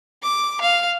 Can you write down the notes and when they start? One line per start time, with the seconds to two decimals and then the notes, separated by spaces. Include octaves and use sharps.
0.23 D6
0.61 F5